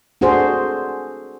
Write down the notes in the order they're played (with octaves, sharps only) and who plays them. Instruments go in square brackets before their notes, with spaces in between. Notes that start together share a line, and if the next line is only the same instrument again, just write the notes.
[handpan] D4 F#4 G#4 A4 C5